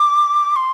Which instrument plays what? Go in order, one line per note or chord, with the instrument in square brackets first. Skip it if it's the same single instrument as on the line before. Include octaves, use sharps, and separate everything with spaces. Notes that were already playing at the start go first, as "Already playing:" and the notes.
Already playing: [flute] D6
C6